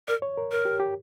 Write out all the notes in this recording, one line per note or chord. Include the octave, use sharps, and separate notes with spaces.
A#4 D5
C#5
A#4
A#4
G4
G4